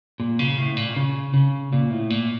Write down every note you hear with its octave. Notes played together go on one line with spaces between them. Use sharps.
A#2
C#3
A2
A#2
C#3
C#3
A#2
A2
A#2